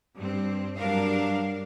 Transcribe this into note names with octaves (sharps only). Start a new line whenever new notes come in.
G2 C4
G2 F#3 G3 D4 A#4 F5